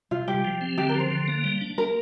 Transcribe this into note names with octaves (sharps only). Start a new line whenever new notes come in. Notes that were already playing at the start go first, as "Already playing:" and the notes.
C3 F4
G3 G4
F3
C4
D3 G4
A#4
F3
C5
D3
A#3
G3
D4
A#3 A#4